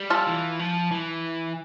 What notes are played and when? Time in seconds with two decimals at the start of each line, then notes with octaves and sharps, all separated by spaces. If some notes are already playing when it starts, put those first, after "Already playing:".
Already playing: G3
0.10 F4 A4
0.27 E3
0.59 F3
0.91 E3